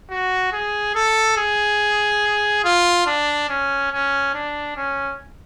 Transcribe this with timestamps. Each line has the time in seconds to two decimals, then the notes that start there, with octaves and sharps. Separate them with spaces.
0.10 F#4
0.52 G#4
0.95 A4
1.37 G#4
2.64 F4
3.06 D4
3.49 C#4
3.92 C#4
4.34 D4
4.76 C#4